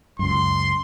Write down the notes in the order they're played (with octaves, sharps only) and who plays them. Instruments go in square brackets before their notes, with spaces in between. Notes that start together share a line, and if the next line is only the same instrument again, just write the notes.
[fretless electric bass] C#2 F#2 [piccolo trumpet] C6